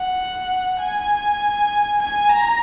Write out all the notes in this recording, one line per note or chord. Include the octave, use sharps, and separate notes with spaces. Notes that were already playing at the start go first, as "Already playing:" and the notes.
Already playing: F#5
G#5
G#5
A#5